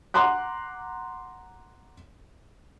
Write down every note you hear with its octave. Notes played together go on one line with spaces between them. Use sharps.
F#5 A#5 C6 D6 F#6